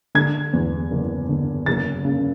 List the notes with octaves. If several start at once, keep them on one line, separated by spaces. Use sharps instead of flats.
D3 G#6
E2
F#1
D3
F#1 A6
C#3